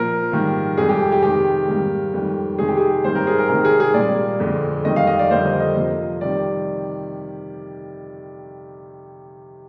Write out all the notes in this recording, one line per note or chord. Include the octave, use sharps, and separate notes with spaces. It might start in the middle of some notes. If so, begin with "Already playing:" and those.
Already playing: A#2 F3 A#3 A#4
G#2 D#3 G3 A#3
F2 C3 G3 G#4
G4
G4
C3 D#3 G#3 G4
G#2 D#3 G3 A#3
F2 D#3 G3
C3 D#3 G#3 G#4
G4
G#4
G#2 D#3 G3 A#3 C5
A#4
G#4
A#4
C3 D#3 G#3 A#4
G#4
G#4
A#2 G3 A#3 D5
F2 D3 G#3
F2 D#3 G3 A#3 D#5
F5
D#5
D5
F2 D3 G3 A#3 C5
D#5
D#5
C3 F3 A#3
C3 D#3 G3 D5